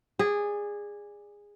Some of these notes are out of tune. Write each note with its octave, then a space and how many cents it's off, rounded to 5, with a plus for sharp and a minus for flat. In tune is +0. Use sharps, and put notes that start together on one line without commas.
G#4 -15 D5 +0